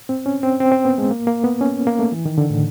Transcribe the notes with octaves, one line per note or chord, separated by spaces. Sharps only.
C4
C#4
C4
C4
C4
B3
G#3
A#3
A#3
B3
C#4
A#3
A3
E3
D#3
D3
A2